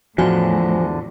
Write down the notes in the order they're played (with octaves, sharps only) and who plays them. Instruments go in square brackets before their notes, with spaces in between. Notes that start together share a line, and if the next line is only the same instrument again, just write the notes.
[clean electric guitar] E2 D3 [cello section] A2 [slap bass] F3 [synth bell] F#4 G#5